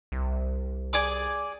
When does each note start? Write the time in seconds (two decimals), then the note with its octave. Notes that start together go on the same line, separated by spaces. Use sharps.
0.12 C2
0.93 G#4 D5 D6